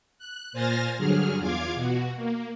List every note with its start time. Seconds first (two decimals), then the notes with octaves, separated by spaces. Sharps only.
0.19 F#6
0.53 A#2 C5 G#5 F6 A6 A#6
0.98 G2 D3 F#3 G#4 F6
1.40 E2 F4 F5 D6 G#6
1.74 B2 F#4
2.16 A#3